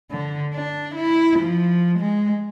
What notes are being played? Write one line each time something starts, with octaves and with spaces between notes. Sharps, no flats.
D3
D4
E4
F3
G#3